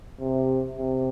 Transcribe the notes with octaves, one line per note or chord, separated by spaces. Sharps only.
C3
C3